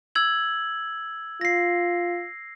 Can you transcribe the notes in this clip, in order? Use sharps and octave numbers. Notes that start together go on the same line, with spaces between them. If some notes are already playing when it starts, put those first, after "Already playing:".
E6 G#6 F#7
F4 A#6 C7